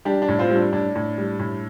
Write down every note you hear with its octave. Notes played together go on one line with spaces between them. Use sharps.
G3 D4 G4
D4
A2
C4 F4
G3
D4
A2 D4
A2
G3
A2